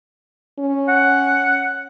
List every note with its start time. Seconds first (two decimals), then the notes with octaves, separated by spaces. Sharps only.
0.59 C#4
0.88 F#5